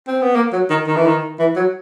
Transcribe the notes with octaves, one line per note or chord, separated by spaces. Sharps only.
C4
B3
A#3
F#3
D#3
D#3
E3
D#3
E3
F#3